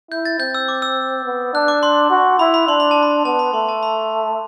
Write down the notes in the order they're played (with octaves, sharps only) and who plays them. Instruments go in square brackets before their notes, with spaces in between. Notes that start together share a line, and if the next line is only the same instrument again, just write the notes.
[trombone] E4 [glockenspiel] G6
[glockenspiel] A6
[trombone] C4 [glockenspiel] G6
[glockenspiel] E6
D6
E6
[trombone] B3
[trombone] D4 [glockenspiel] F#6
[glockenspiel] D6
C6
[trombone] F#4
[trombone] E4 [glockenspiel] B5
[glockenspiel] B5
[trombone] D4 [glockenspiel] C6
[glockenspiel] B5
A5
B5
[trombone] B3 [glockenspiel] A5
[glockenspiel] B5
[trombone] A3 [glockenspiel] C6
[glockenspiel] A5
B5